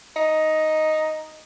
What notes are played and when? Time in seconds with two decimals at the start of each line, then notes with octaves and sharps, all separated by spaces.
0.16 D#4